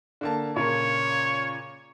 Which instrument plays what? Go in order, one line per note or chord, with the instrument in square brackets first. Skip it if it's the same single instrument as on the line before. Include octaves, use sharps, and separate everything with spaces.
[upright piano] D3 A#3 A5
[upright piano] A#2 C#3 A#4 [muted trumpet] C#5